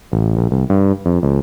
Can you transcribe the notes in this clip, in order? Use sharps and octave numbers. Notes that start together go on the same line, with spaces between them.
A1
A#1
C2
G2
F2
C#2